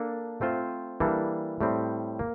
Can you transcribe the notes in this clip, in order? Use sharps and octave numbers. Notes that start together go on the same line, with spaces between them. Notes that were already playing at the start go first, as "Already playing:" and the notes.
Already playing: A#3 D4 A4
A3 C4 F4 C5
E3 G3 A#3 D4 A4
A2 G3 C4
A#3